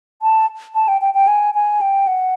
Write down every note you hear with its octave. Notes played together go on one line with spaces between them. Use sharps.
A5
A5
G5
G5
G5
G#5
G#5
G5
F#5